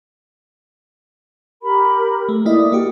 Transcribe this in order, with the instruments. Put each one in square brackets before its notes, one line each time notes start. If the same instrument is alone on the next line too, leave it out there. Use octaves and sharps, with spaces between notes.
[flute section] G4 A#4 B5
[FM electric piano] A3
[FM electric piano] A#3 E4 D#5 [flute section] D5 D#6
[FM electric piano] A#3 F#4 G4